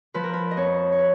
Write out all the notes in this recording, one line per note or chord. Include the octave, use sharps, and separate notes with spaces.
F3 B4
A#4
B4
D#5
F2 C#5
C#5
B4